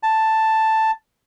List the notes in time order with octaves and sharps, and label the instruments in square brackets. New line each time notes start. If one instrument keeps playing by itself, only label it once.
[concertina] A5